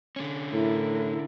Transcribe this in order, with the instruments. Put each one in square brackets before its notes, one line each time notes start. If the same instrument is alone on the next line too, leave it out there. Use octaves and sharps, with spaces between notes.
[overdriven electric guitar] D3 C#4
[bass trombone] A2 [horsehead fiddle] E4 A#4